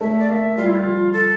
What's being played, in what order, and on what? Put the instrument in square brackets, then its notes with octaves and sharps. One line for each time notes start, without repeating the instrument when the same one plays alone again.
[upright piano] A3 [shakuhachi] E5
[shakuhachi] D5
[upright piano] A#3 [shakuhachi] F5
[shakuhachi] E5
[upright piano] G3 [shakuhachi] F4
[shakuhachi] E4
A4
F4
[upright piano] F3
[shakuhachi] A4